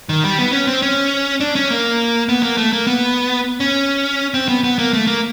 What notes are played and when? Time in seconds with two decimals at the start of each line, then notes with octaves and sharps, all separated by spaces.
0.09 D#3
0.24 G3
0.39 B3
0.52 C#4
0.67 C4
0.82 C#4
1.40 D4
1.56 C#4
1.70 A#3
2.29 B3
2.43 A#3
2.57 A3
2.73 A#3
2.87 B3
3.60 C#4
4.34 C4
4.48 B3
4.64 B3
4.79 A#3
4.93 A3
5.07 A#3